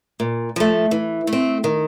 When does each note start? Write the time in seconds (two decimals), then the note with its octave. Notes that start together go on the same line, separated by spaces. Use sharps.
0.20 A#2
0.56 F3 A3
0.91 E3
1.27 A3
1.33 C4
1.64 D#3